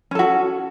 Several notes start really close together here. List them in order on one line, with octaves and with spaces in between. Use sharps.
C#4 A4 F#4